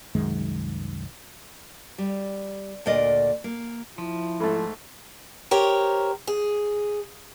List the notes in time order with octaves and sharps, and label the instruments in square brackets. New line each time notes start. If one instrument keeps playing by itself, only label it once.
[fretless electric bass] C2 F#2 D#3 G#3
[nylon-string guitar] G3
D2 A#2 D5 D#5
A#3
[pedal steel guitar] F3 [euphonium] E4
[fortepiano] G#2 A3 [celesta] A4 B5
[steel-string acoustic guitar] G4 A#4 C5 C#5
G#4